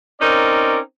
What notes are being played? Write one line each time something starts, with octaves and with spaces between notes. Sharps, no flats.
C4 C#4 D#4 A#4 D5